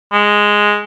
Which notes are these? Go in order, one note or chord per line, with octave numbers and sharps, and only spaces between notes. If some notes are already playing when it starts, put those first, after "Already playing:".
G#3